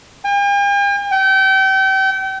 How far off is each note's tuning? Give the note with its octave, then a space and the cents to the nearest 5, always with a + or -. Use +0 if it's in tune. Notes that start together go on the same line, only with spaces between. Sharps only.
G5 +45
G5 -35